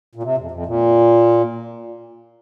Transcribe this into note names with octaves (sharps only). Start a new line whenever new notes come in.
A#2
C3
F2
F2
A#2